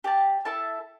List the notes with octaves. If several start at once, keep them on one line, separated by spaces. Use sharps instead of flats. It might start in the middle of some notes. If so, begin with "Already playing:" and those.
G4 D5 A5
E4 A4 E5 A5